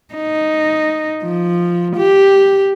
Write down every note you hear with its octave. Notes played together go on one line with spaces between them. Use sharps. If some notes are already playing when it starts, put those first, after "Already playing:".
D#4
F3
G4